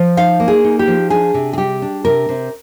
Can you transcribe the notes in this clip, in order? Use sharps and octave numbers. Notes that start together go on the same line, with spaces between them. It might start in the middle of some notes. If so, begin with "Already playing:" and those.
Already playing: F3
D#4 F5
A#3
G#4
D#4
G4
F3
D4 G#4
C3
G#4
G3 G4
D4
C3 A#4
C3